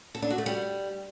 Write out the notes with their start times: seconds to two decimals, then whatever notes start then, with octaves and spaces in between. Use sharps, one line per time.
0.15 A4
0.22 D4
0.30 F#4
0.38 A3
0.46 G3